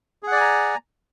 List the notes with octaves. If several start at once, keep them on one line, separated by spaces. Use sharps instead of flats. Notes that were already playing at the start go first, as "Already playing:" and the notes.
G#4 D5 F#5 G#5 A#5